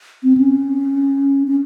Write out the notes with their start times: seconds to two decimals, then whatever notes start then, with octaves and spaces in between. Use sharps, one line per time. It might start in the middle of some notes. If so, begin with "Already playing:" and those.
0.24 C4
0.37 C#4
1.47 C#4